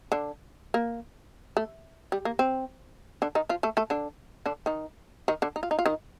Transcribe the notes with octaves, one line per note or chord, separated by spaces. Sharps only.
D3 D4
A#3
A3
G3
A#3
C4
D3 D4
D#3 D#4
F3 F4
A3 A4
A3 A4
D3 D4
D3 D4
D#3 D#4
D#3 D#4
D3 D4
D#4
F4
D#4
F4
D#3 D#4